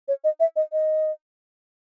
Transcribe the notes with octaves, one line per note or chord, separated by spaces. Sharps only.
C#5
D#5
E5
D#5
D#5